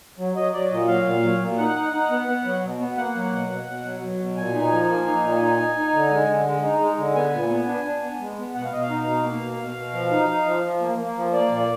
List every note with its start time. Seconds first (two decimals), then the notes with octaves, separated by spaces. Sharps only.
0.18 F#3
0.36 F#3 D#5
0.53 F#3 D5
0.71 A#2 D#5
0.88 F#3 F5
1.05 A#2
1.23 F#3
1.40 A#2
1.57 D#4 F#5
1.75 D#4
1.93 D#4
2.10 B3
2.28 B3
2.45 F#3
2.62 B2
2.80 B3
2.97 A#3 F#5
3.15 F#3
3.32 B2
3.50 B2
3.67 B2
3.84 F#3
4.02 F#3
4.19 B2
4.37 A#2 G#5
4.54 D#4
4.71 F3
4.89 A#3
5.06 D#4
5.23 A#2
5.41 D#4
5.58 D#4
5.76 D#4
5.93 D3
6.11 G#3
6.28 D3
6.45 G#3
6.63 D#4
6.80 G#3
6.98 D3
7.15 B3 G#5
7.33 A#2
7.50 B3
7.68 D4
7.85 D4
8.02 B3
8.20 G#3
8.37 B3
8.55 B2 F#5
8.65 F5
8.72 B2 D#5
8.83 F5
8.90 D#4
9.07 B2
9.24 A#3
9.42 B2
9.59 B2
9.76 B2
9.94 F3
10.11 D#4
10.28 D#4
10.46 F3
10.63 F3
10.81 A#3
10.98 A#3
11.16 F3
11.33 A#3 D5
11.51 A#2